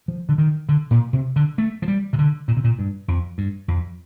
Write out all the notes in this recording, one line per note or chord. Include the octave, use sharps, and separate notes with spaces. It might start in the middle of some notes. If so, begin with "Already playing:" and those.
F3
D3
D#3
D3
A#2
C3
D3
A3
F3
G3
C3
D3
A#2
C3
A#2
G2
F2
G2
F2